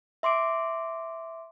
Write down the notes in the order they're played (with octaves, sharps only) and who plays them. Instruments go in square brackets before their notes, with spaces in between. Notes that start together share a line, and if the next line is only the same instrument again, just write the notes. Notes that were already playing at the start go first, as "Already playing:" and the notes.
[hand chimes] E5 C6 D6 D7